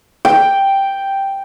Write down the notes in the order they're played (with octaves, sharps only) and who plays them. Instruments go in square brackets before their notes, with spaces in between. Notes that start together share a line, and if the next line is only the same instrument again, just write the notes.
[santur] G5